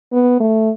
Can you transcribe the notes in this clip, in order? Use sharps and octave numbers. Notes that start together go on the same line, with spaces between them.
B3
A3